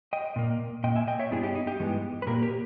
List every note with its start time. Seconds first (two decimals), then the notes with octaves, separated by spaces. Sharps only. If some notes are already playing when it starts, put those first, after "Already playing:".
0.13 D#5 G5
0.36 A#2 A#3
0.84 A#2 A#3 D#5 G5
0.96 E5 G#5
1.07 D#5 G5
1.19 C#5 E5
1.31 G2 G3 B3 E4 G#4
1.43 D#4 G4
1.55 D#4
1.67 D#4 G4
1.79 G2 E3 G#3 B3
2.22 B4
2.27 A#2 A#3 G4 A#4
2.42 G4 A#4